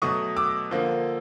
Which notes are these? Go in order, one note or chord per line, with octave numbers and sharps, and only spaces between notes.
B2 F#3 A3 C#6 D#6
D6 E6
D3 F3 A#3